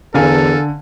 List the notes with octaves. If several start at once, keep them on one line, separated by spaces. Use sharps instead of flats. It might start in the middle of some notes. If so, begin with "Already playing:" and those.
E2 D3 A4 A#4 F5 G#5